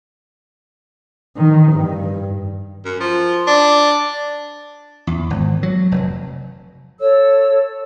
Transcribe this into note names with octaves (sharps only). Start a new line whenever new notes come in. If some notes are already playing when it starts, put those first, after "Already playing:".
D#3
G2
F#2
F3
D4
E2
G#1
F#3
F1
A4 C#5 E6